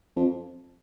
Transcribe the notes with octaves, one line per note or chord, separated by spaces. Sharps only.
F2